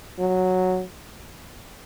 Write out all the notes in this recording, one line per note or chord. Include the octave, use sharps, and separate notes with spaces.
F#3